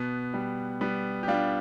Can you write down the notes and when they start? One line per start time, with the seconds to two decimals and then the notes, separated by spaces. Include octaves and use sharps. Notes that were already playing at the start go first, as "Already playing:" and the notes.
Already playing: B2 B3
0.34 G3
0.81 G3 B3
1.23 G4
1.28 G3 D4 F4